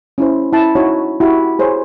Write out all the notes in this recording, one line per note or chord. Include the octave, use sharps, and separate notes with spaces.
C#4 E4 C5
E4 A5
D#4 E4 F#4 C#5
E4 F#4 G4
G#4 C5 C#5